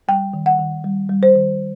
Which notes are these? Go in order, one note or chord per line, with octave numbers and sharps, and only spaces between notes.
G3 G5
D#3
F#5
D#3
G3
G3
C5
D#3